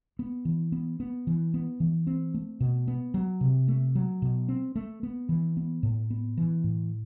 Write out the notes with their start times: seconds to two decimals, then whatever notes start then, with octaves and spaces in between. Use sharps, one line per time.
0.19 B3
0.45 E3
0.72 B3
1.00 B3
1.27 E3
1.54 B3
1.80 E3
2.07 C4
2.34 A3
2.60 B2
2.88 B3
3.14 F#3
3.41 C3
3.68 A3
3.95 F#3
4.22 B2
4.48 C4
4.76 A3
5.03 B3
5.29 E3
5.57 B3
5.83 A2
6.10 B3
6.37 E3
6.64 A2